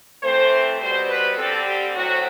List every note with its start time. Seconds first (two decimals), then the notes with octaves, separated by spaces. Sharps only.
0.22 E3 A3 C4 C5
0.80 B2 G3 C4 C5
1.09 B4
1.37 D3 G3 C4 A4
1.65 G4
1.94 A2 F#3 C4 F#4